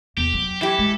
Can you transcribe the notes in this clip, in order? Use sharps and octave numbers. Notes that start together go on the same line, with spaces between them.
E2 G4
F#3
E3 E4 G4 A4
G#3